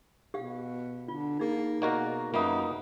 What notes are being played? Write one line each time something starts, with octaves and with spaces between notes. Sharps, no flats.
B2 G4 F5
D3 F4
A#3 D#4 G#4
B2 A#3 F#4 G4 A#4 D5 D#5
F#2 A#3 B3 D#4 F4 E5 D#6